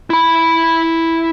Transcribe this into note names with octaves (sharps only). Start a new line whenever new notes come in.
E4 B5